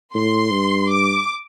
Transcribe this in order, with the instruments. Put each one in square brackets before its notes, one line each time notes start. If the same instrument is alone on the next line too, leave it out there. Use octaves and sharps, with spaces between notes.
[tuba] A2 [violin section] C6
[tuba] G2
[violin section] D6